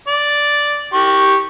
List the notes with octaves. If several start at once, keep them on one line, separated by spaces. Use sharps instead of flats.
D5
G4 C#6